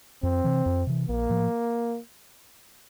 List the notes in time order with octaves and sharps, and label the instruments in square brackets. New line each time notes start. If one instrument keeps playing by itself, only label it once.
[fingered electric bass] F2 [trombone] C4
[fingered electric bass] C3 E3
F2
C3 E3
[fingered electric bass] A#1 [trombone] A#3
[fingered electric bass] A2 F3